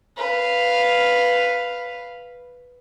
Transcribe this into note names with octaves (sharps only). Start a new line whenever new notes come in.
B4 F5